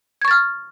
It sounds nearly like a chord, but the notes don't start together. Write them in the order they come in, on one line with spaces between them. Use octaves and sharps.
G#6 C#6 A6 F6